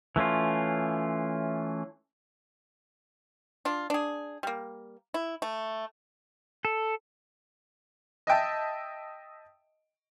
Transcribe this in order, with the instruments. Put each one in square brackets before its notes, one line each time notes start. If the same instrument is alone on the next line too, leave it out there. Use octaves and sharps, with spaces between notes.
[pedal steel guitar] E3 A3 C#4 F4
[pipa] D4 F4
D4 G#4
G3 A#3
E4
A3
[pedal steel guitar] A4
[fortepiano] D#5 E5 G5 A5